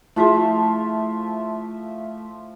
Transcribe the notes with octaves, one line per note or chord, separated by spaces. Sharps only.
F3 A3 E4 F4 G#4 E5